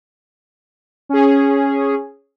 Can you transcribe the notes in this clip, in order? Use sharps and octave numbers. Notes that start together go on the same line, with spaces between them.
C#4 G#4